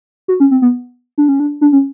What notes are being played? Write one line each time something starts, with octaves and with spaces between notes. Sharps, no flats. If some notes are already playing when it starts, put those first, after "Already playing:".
F#4
C#4
C4
B3
D4
C#4
D4
D4
C#4